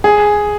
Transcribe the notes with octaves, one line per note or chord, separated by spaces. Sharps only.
G#4